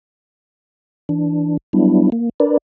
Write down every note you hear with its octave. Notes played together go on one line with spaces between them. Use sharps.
E3 D4
F#3 G3 B3 D4 E4
A#3
D4 A#4 B4 D5